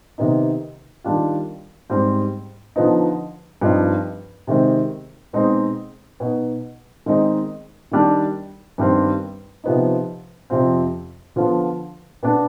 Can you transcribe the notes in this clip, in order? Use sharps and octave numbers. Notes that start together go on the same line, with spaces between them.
C3 D#3 B3 D#4
D#3 G3 D4 F4
G#2 G3 C4
D3 F3 B3 D#4
G2 F3 C4 D#4
C3 D#3 G#3 C4
B2 G#3 C4 D#4
B2 B3 D#4
D#3 G#3 C4 D#4
D#3 G3 D4
G2 D#3 G3 C4
C3 F3 B3 D#4
F2 C3 F3 C4
D3 F3 B3 F4
B2 B3 D4